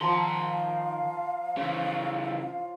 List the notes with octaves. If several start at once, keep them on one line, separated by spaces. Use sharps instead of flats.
D#3 F3 F5 A5 A#5 C6
C#3 E3 C#5